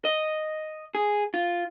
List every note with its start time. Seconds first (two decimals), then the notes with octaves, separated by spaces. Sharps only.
0.05 D#5
0.95 G#4
1.34 F4